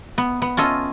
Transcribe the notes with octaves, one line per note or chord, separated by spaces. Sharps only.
B3
B3
C#4 F4 A4 D#5